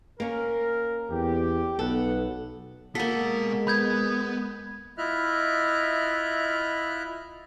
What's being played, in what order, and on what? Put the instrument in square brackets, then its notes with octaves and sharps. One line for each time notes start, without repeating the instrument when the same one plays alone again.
[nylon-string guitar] A#3 C#4 [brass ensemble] A#4
[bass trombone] E2 [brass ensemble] G4
[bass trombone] B1 [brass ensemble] B3 F#5 [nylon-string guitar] A4
[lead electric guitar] B2 F#5 [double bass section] G#3 [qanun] A#3 A4 [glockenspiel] B6
[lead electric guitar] B3 [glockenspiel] B5 G6 G#6
[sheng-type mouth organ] E4 F4 D#5 E5 F6 F#6